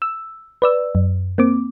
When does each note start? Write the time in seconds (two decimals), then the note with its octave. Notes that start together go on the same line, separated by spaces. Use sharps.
0.02 E6
0.62 B4 D5 E6
0.95 F#2
1.38 A#3 C4 D6